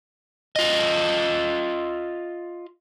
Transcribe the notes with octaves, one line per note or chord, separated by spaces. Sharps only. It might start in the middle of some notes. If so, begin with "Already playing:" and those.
F4 D#5